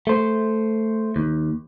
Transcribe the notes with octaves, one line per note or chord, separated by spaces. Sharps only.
A3 C5
D#2